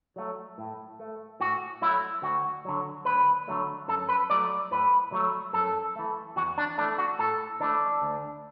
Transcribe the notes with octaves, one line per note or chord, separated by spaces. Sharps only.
F#3 A3
A2
A3
A2 F#4
F#3 A3 E4
D2 F#4
D3 F#3
D2 B4
D3 F#3 A3
F#2 A4
B4
F#3 A3 D5
A2 B4
F#3 A3
F#2 A4
E3 A3
E2 F#4
D4
E3 A3 D4
F#4
A2 A4
E3 A3 D4
D2